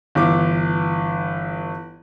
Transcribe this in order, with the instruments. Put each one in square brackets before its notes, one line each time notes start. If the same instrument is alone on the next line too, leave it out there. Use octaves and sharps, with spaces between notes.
[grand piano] G1 E3 D6